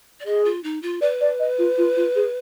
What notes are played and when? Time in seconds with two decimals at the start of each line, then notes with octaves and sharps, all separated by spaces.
0.20 D5
0.26 G#4 D#5
0.45 F4
0.64 D#4
0.83 F4
1.01 B4 D5
1.21 D5
1.39 D#5
1.58 F4
1.78 F4
1.97 F4
2.15 G#4